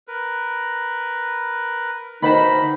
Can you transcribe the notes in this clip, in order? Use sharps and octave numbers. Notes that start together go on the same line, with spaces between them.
A#4 B4
D2 D#3 D#4 B4 C5 B5